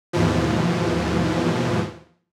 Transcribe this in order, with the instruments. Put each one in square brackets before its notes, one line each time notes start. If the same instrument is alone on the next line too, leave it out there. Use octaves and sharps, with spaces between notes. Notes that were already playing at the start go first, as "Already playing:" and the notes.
[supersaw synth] D#2 G#2 B2 E3 F3